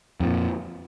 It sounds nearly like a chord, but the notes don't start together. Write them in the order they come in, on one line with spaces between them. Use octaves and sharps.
F2 F3 A#2